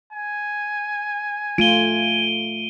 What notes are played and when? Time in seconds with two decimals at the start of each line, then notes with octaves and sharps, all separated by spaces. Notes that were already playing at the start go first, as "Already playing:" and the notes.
0.13 G#5
1.58 A3 F4 D7 D#7 G7